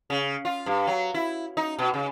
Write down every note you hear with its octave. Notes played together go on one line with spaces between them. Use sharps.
C#3
F4
G2
F#3
E4
D#4
B2
C#3